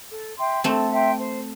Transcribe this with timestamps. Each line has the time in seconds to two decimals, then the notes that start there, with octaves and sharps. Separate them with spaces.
0.11 A4
0.38 E5 G5 C6
0.64 A3 C4 A4
0.90 E5 G5 C6
1.17 C5